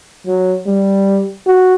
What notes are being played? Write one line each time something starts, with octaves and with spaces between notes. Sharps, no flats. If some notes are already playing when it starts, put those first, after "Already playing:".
F#3
G3
F#4